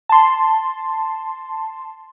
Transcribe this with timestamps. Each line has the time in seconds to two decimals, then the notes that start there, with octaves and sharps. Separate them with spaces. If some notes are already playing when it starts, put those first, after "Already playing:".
0.09 A5 C6